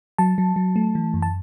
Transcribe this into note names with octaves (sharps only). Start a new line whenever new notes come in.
F#3 A5
F#3
F#3
A3
E3
F#2
A5